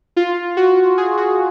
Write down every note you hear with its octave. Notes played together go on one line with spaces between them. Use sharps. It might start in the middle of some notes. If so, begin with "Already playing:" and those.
F4
F#4
G#4
F#4